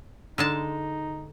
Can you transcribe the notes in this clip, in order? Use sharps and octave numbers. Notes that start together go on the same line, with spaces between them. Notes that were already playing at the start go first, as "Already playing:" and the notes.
D3 G#3 D#4 A5